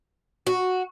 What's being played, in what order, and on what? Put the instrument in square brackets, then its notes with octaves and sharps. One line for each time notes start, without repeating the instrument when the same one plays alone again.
[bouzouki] F#4